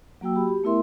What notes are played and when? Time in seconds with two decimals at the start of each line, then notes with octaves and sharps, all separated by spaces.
0.21 F#3 A#3 F#4 G5 E6
0.35 F#4 G4 B5
0.48 G4
0.64 A3 B3 E4 A#4 E5 C6